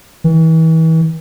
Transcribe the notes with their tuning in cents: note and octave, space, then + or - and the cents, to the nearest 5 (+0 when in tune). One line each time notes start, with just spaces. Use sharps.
E3 -35